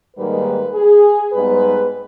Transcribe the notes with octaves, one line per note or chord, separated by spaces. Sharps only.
G#2 D#3 G3 A#3 B4
G#4
G#2 G3 B3 B4